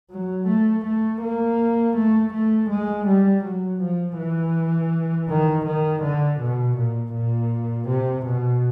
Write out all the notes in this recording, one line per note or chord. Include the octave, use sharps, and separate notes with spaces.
F#3
A3
A3
A#3
A3
A3
G#3
G3
F#3
F3
E3
D#3
D#3
D3
B2
A#2
A#2
C3
B2